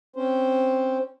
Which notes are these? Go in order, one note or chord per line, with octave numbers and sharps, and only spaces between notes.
C4 C#4 C5